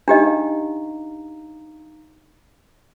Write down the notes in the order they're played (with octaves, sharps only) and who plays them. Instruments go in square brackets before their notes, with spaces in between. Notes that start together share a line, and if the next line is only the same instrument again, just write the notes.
[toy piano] D4 G4 D#5 [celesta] D#4 F5 A#5